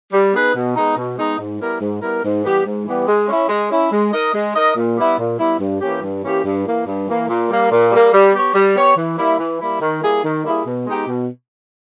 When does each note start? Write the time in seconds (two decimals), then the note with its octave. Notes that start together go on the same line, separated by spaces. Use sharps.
0.13 G3
0.34 B3 D#4 G#4 B4
0.55 B2
0.76 G#3 B3 D#4
0.97 B2
1.18 G#3 B3 D#4
1.39 G#2
1.60 G3 B3 E4 A#4
1.81 G#2
2.02 G3 B3 E4 A#4
2.24 G#2
2.45 E3 G3 B3 G4
2.65 G#2
2.86 E3 G3 B3 G4
3.08 G#3
3.29 C#4 E4
3.49 G#3
3.71 C#4 E4
3.92 G#3
4.13 D#4 A#4 D#5
4.34 G#3
4.55 D#4 A#4 D#5
4.76 A#2
4.97 G3 B3 E4
5.18 A#2
5.39 G3 B3 E4
5.60 G2
5.81 E3 A#3 C#4 G4
6.02 G2
6.23 E3 A#3 C#4 G4
6.44 G2
6.65 E3 A#3
6.86 G2
7.08 E3 A#3
7.28 A#2
7.50 G3 A#3
7.71 A#2
7.92 G3 A#3
8.12 G3
8.34 B3 G4 C#5
8.54 G3
8.76 B3 G4 C#5
8.97 E3
9.18 G3 A#3 E4
9.39 E3
9.60 G3 A#3 E4
9.81 D#3
10.03 G3 A#3 E4 G#4
10.23 D#3
10.44 G3 A#3 E4 G#4
10.65 B2
10.86 G#3 B3 D#4 G4
11.07 B2